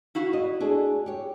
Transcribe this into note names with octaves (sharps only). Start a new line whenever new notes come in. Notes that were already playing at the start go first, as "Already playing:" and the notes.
E4 F#4 F5
D#5
D4 G#4 A4
G4 C#5